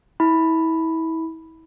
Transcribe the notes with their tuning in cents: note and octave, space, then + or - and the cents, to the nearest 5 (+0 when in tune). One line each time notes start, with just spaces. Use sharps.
E4 -30 B5 +0